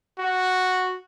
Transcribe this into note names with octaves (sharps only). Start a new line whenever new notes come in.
F#4